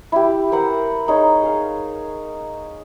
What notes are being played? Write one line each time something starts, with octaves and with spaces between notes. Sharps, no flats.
E4 G4
A#4 C5 F#5 B5
D#4 G#4 C#5
G#4 F5